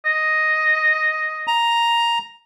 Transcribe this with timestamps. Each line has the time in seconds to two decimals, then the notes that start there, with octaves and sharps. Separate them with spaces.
0.05 D#5
1.47 A#5